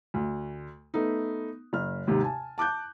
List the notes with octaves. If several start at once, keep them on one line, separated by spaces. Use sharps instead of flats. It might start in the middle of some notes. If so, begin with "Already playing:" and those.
D2
A3 B3 D#4
F#1 F6
D#2 G#2 C3 D#3
G#5 A5
A5 D6 F#6 G6